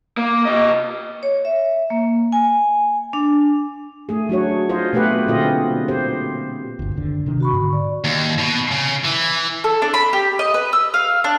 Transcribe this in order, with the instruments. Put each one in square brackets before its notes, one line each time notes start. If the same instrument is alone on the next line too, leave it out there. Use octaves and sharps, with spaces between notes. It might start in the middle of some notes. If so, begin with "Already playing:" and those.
[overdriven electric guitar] A#3
C3 D#5
[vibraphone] C#5
E5
A#3
G#5
D4
[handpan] A3 G#4
F#3 D4 F#4 C#5
F4 C5 D#5
B2 A3 G4 G#4 B4 F#5
A#2 D3 C4 F4 D#5
G4 C5
[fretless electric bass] G1 D2
F#1 D#2 D3
C3 D#3 D4
[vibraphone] F#4 B5 C#6
[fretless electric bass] G#2 D3
[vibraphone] D5
[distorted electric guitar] D#2
B2
C#3
E3
[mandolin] A4
D4
B5
G4
D#5
B4
E6
F5
D4